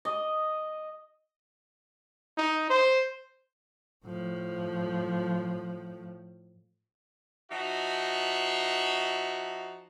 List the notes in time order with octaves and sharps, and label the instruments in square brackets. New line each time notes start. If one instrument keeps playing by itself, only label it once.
[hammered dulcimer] D#5
[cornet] D#4
C5
[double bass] A2 F3
[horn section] F3 D#4 F#4 E5